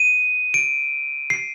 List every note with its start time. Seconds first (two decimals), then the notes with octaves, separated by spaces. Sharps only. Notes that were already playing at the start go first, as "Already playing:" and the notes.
Already playing: D#7
0.54 D7
1.30 C7